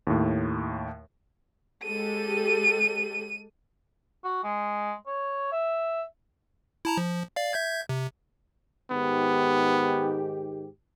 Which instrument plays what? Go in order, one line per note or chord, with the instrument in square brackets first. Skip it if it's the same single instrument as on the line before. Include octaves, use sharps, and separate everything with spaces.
[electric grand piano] D#2 A2
[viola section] G#3 G4 A4 [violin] D#7
[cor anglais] F#4
G#3
C#5
E5
[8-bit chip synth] E4 A5 A#5
F3
D5 F5
E5 G6 G#6
C3
[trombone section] G#2 D#3 G4 [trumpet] B3